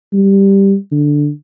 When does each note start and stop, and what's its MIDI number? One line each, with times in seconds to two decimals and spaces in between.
0.13 0.76 55
0.92 1.30 50